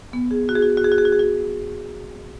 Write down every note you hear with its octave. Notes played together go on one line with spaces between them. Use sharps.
B3
G#4
F#4
G#4
F#4
G#4
F#4
G#4
F#4
G#4
F#4
G#4
F#4